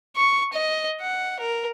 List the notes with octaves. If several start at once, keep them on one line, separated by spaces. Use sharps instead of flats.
C#6
D#5
F#5
A#4